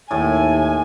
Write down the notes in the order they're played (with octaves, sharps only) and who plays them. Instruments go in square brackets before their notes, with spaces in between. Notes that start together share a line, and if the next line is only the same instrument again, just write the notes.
[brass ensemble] D#2 [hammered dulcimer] A2 [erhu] G#5